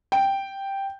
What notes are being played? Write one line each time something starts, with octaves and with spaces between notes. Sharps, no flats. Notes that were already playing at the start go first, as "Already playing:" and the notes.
G5